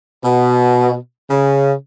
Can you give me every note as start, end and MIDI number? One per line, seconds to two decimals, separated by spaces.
0.23 0.94 47
1.30 1.71 49